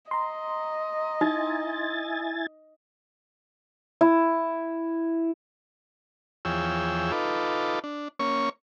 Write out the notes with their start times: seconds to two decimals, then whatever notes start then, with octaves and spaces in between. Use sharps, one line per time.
0.11 D#5 A#5 C6
1.21 D#4 E4 G#5 A6
4.01 E4
6.45 E2 F3 G#4 C#5 G5 E6
7.12 D#4 F4 A4 B4 D6
7.84 D4
8.19 A#3 C#4 C#5 C#6